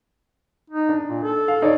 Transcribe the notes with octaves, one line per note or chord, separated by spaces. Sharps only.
D#4
D4
A#2
A4
F5
D#4 C#5 D5